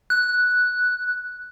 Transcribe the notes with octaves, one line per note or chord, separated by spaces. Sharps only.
F#6